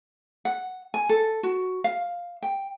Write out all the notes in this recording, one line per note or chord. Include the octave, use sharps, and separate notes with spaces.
F#5
G#5
A4
F#4
F5
G5